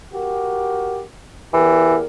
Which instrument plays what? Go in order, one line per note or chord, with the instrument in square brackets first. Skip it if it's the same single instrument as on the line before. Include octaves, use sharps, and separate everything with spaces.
[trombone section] F#4 G4 A#4
[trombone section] E2 G4 A#4 [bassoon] E3